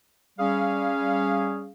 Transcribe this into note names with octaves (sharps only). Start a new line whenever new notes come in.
G3 C#4 G#4 F5